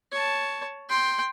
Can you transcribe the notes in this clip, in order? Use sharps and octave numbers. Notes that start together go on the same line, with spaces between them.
C#5 A5
G5 C6